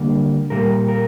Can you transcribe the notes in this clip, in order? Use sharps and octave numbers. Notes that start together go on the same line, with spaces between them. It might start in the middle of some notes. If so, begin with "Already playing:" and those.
Already playing: D3 G3 A#3
A#2 G3 A#3 A#4
A#4